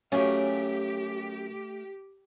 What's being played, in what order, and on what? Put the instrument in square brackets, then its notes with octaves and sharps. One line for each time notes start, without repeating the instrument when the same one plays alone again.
[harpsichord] F#2 [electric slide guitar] A3 F5 [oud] C#4 [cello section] G4